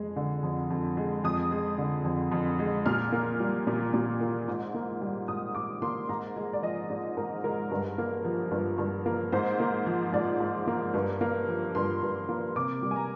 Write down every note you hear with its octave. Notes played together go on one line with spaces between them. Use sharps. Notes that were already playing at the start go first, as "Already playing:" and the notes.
Already playing: F2 G#3
D3
F2
F2
G#3
F2 D#6
G#3
D3
F2
F2
G#3
A#2 F6
A#3
G3
A#2
A#2
A#3
G#2
A#3
G3
G#2 D#6
G#2 D6
A#3 C6
G#2 A#5
G#3
D5
F3 D#5
G#2 D5
G#2 A#4
G#3 A#4
G2
A#3
F3
G2
G2
A#3
G#2 C5
A#3
F3
G#2 D5
G#2
A#3
G2
A#3
F3
G2 C6
G2
A#3
C3 D6
G3
G#5
A#5